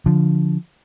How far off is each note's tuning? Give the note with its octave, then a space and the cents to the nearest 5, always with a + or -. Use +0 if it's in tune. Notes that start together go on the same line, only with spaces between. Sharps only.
D3 -20 F3 +0